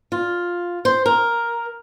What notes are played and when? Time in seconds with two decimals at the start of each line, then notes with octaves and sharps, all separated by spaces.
0.12 F4
0.85 C5
1.06 A#4